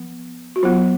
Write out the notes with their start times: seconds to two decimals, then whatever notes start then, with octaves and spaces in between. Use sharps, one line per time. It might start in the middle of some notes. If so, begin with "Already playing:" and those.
Already playing: F3 B3
0.56 F#4
0.63 F#3 B3 F4